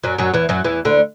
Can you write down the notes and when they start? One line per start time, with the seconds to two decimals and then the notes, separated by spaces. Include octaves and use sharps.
0.04 F#2 F#3
0.18 F#2 F#3
0.34 E2 E3
0.49 F#2 F#3
0.64 E2 E3
0.85 D2 D3